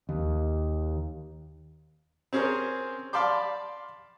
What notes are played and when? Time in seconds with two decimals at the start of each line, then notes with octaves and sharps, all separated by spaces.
0.09 D#2
2.33 C4 C#4 G#4 A#4 C5
3.13 D5 F5 A5 B5 C6 D6